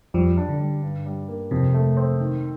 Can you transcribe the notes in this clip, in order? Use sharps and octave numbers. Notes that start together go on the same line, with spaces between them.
F2 F3 G3
D4
D3
G3
G2
G3
A#3
F2 C3
A3
C4
D#3